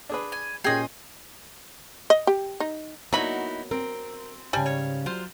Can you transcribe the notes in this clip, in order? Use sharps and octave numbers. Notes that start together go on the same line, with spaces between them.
D4 G#4 B4
G#5
A#2 C#4 G#4 D#5 G5 G#5 C7
D#5
G4
D#4
F#3 A#3 B3 D#4 E4 F#4 B5
C4 A#4
G#2 C#3 G3 G#5
C#5
F#3 F4 C5